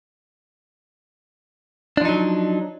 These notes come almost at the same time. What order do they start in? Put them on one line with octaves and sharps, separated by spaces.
D4 F3 D#4 F#3